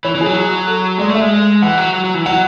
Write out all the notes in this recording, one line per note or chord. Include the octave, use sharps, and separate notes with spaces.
E3 C#5
E3
G#4
F#3
G#4
A4
G#3 D5
A3
G#3 E5
E3 F#5
F#3
F#3
F#3
E3
F#3 F#5